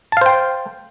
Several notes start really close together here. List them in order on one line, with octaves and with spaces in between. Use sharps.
A5 F5 C5 G5